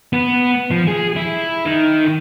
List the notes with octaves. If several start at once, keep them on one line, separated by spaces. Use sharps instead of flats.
B3
F3
G#4
E4
D#3